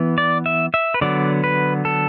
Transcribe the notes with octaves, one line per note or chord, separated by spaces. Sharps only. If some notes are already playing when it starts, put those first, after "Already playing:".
Already playing: E3 B3
D5
E5
E5
B4
D3 F#3 B3 D5
B4
A4